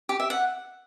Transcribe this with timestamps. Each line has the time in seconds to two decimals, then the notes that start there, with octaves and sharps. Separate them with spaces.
0.09 G4
0.20 E5
0.30 F#5